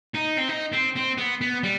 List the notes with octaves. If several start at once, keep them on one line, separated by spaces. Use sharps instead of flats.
D#4
C4
D#4
C4
C4
B3
B3
G3